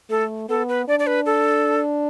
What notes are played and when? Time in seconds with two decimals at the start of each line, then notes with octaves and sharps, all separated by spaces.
0.10 A3 A4
0.49 B3 A4
0.68 B4
0.88 D4 D5
0.99 D5
1.07 B4
1.26 A4